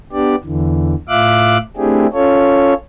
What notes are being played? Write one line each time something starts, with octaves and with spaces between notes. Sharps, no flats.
B3 D4 G4 D5
E2 D3 E3
A2 F4 E5 F5 D6 F#6
A3 C4 D4 E4 G4 G#4
C#4 F4 A4 C#5